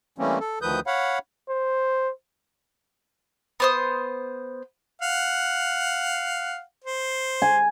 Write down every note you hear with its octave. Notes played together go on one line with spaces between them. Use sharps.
E3 G3 A3 A#3 C4 C#4
A4
D2 D#3 F3 B4 D#6 G6
C#5 F5 F#5 B5
C5
B3 C5 D#6
F5 F#5
C5
G#5